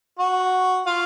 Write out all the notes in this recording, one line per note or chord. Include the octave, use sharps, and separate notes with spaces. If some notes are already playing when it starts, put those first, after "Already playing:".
F#4
F4